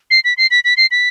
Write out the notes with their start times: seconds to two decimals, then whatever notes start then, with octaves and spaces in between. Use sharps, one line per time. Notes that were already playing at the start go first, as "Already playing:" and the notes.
0.11 C7
0.24 B6
0.37 C7
0.51 B6
0.64 B6
0.77 C7
0.91 B6